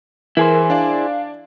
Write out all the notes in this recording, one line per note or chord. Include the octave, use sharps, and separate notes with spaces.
E3 E4 G#4 A#4 C5
D4 D5 F5